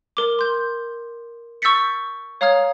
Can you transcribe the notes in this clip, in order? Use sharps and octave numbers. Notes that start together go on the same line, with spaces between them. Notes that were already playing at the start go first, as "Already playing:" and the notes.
A#4 D6
C6 G6
C#6 E6 G6 A6 B6 C#7
C#5 F5 A#5 D#6 F6 G#6